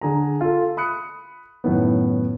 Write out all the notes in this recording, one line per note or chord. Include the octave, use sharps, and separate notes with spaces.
D3 G#4 A#5
F4 A4
B5 D#6 F#6 C#7
F#2 A2 D#3 B3